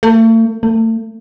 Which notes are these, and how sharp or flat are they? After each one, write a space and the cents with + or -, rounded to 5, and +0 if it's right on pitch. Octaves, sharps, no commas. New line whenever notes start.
A3 +40
A3 +35